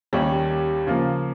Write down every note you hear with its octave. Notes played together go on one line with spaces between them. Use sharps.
D#2 D#3 G3 C#4 G4
C#3 F3 A#3